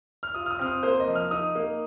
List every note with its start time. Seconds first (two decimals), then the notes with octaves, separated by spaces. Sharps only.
0.23 F6
0.34 F4 D#6
0.46 F6
0.51 D#6
0.59 C4 F6
0.67 D#6
0.83 A#3 C5
1.00 D#5
1.07 F3
1.15 F6
1.31 D#4 D#6
1.55 A#3